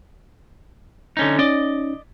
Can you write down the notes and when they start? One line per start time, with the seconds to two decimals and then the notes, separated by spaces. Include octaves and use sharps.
1.17 D3 C#4 D#4
1.39 C#4 D#4 D5 D#5